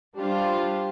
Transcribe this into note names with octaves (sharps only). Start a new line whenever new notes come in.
G3 D4 F4 G4 C5